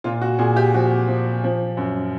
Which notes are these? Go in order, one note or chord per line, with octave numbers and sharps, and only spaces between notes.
A#2 F4
F#4
A#2 G#4
G4
F3 F#4
F3
F3
F#2